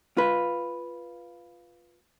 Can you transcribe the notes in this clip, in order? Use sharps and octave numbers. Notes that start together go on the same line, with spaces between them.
F4 B4